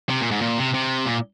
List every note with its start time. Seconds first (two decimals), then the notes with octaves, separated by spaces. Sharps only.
0.09 C3
0.21 A#2
0.31 G#2
0.41 A#2
0.58 C3
0.74 C3
1.06 A#2